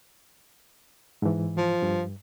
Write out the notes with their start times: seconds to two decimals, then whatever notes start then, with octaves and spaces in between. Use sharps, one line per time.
1.22 G#2 E3
1.58 F3
1.82 G2